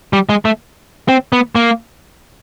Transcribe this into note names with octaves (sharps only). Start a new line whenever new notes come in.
G3
G#3
A3
C4
B3
A#3